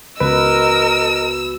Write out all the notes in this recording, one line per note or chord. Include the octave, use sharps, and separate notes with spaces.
C#2 B3 F#4 A#4 B4 D#5 E6